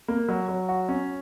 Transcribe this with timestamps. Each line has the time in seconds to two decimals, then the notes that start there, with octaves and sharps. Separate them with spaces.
0.08 A#3
0.29 F#3
0.48 F#3
0.69 F#4
0.89 C#4